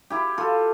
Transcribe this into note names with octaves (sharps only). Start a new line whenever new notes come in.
E4 G4
F4 A4